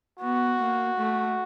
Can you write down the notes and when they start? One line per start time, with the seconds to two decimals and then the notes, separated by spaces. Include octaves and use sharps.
0.20 B3 F#4
0.59 A#3
0.98 A3